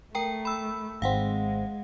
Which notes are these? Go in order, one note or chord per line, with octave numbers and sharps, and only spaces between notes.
A3 A#4 G5 A#5
B5 E6
G#1 G#3 C4 F5 F#5